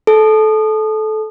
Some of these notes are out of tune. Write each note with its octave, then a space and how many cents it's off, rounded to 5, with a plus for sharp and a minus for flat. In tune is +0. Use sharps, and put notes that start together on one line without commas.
A4 -20